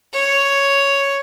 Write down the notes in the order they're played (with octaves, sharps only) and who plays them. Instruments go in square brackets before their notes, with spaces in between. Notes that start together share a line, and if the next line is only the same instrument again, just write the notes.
[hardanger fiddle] C#5